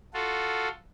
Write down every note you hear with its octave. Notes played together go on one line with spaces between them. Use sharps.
F4 F#4 A4